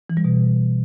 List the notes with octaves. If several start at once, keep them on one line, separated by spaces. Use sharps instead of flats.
E3
G3
B2